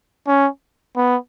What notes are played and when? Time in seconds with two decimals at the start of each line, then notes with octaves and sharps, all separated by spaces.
0.27 C#4
0.96 B3